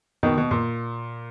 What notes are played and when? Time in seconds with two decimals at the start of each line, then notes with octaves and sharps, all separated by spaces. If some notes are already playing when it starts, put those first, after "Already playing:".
0.23 B2 D#3
0.38 B2
0.51 A#2